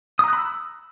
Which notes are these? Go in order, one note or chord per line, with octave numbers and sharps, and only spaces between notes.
A#5 B5 D#6 E6 F#6